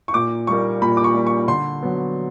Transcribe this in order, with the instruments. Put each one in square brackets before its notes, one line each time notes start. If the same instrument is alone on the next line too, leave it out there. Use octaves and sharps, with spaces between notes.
[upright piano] C#6
[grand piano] A#2 [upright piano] D6
[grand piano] G3 A#3 [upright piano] C#6
[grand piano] A#2 [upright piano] B5
[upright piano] D6
C#6
[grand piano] G3 A#3
[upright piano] C#6
[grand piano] D3 [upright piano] C6
[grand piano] F#3 B3